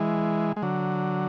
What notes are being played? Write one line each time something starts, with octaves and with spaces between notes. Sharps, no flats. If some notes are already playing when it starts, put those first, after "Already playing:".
Already playing: E3 G#3
G#3
D3 F#3